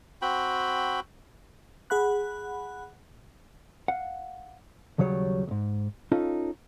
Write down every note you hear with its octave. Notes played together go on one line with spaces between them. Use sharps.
C4 F#4 G5 B5
G#4 F#5 B5 F#6
F5 F#5
D#2 C#3 F#3 G3 C#5
C#2 G#2
C#4 D#4 F4 A4